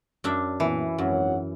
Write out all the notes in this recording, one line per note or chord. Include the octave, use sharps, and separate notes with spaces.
F#2 D4 E5
A#2 E3 B3
G#1 F#2 C#5 F#5